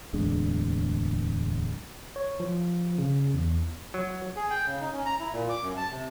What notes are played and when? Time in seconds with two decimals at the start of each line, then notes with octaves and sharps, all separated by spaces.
0.13 D1 E2 G#3 D4
2.16 C#5
2.40 F3
2.98 C#3
3.34 E2
3.94 F#3
4.36 G#4
4.50 G5
4.66 C#3
4.80 D#4
4.93 C#4
5.06 A#5
5.20 E4
5.33 A#2
5.49 D6
5.62 F#2
5.77 A5
5.91 C3